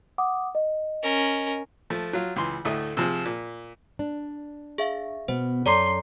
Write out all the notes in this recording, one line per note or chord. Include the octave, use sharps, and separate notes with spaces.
F#5 D6 D#6
D#5
C#4 A#4
F3 A3
F#3 F4
C#2 E3 C6
D2 A2 A3 D#5 E5
C3 F3 G#4
A#2
D4
G#4 E5 F5
B2 B3 C5
F#2 A4 C#5 D5 A#5 C6 D6